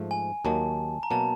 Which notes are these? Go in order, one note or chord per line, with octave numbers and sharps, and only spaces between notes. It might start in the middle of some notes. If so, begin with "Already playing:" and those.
Already playing: G#2 F3 A3
G#5
D#2 D#3 F#3 A#3 D#4 A5
A#5
B2 F#3 A#3 A5